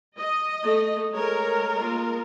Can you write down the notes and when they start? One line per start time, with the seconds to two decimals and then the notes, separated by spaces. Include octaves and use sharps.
0.19 D#5
0.63 A3
1.13 G#3 A3 A#4 C#5
1.79 A#3 F4